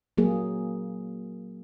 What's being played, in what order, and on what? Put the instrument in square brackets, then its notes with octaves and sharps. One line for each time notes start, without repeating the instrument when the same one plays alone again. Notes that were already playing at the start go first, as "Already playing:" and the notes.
[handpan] F#3 A#3 G#4